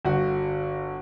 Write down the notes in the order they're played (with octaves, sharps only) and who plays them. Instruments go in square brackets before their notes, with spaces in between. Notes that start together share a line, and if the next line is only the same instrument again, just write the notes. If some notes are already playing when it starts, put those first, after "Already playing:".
[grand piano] G1 F#4